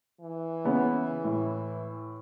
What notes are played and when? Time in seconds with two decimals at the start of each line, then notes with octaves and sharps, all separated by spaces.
0.20 E3
0.65 C#3 B3 C#4
1.24 A2